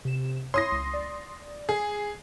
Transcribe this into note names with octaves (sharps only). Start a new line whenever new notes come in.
C3 E7
E4 C#5 C6 D#6 A#6
C#2
D5
G#4